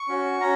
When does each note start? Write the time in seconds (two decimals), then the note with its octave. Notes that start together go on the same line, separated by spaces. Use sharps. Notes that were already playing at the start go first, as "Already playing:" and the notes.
Already playing: C#6
0.08 C#4 F#4
0.40 C#4 F#4 A#5